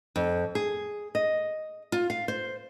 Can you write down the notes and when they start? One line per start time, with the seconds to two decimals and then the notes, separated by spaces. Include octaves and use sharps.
0.16 F2
0.55 G#4
1.15 D#5
1.92 F4
2.10 F5
2.28 C5